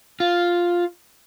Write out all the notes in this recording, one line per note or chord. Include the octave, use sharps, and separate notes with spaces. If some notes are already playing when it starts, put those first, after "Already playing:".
F4